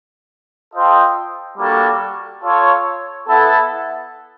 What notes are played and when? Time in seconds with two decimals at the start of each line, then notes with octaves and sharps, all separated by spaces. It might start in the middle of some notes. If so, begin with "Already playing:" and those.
0.74 F4 A4 C5 D#5 G5
1.59 G3 A#3 D4 F#4 A4
2.43 F4 A4 C#5
3.28 B3 E4 A4